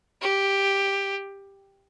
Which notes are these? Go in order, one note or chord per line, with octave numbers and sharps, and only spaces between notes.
G4